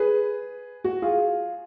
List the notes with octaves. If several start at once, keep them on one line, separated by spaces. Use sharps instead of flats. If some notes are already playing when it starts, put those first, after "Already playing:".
Already playing: G#4 B4
F#4
F4 G#4